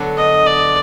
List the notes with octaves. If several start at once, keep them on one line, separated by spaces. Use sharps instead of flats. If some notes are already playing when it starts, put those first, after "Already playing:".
Already playing: D3 F#3 B3 D4 F#4
D#5
D5